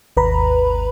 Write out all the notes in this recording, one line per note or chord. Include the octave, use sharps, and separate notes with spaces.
G#1 D#2 B4 A#5 B5